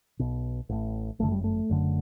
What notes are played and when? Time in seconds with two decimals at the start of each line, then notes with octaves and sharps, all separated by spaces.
0.19 B1 B2
0.69 A1 A2
1.19 G1 F#2 D3 A3
1.31 G3
1.44 A3
1.69 F#1 F#2 D3